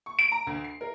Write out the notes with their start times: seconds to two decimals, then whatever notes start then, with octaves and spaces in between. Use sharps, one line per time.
0.06 C#6
0.19 D7
0.32 A#5
0.47 D2
0.64 C7
0.81 A#4